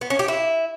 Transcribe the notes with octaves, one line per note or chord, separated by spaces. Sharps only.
B3
C#4
G4
E4